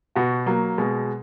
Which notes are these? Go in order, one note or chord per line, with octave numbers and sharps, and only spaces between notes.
B2 F#4
F#3 A#3
B2 G#3